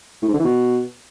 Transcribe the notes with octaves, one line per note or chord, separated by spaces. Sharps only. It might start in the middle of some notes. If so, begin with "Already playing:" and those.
A2
G#2
D3
E3
B2